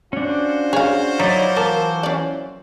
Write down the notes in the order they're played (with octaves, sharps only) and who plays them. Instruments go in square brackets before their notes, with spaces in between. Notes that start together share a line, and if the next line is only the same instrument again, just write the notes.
[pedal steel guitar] C#4 D4 [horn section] F4 F#4 C5
[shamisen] G#4 F5 [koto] C#5
[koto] F#3 [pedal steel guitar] D#4 E4 D5
[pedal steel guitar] E3 A5 D6 [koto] A#3
[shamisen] C#4 D5